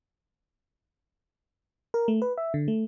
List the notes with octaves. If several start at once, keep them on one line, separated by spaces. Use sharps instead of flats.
A#4
A3
B4
E5
D3
A3